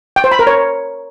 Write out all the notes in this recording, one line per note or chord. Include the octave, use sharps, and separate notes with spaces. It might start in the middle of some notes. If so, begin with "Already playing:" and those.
G5
C5
B5
A#4
C#5